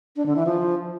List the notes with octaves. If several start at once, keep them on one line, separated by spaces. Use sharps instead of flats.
D4
D3
E3
F3